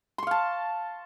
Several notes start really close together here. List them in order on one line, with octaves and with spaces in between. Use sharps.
C6 C#6 F5 A5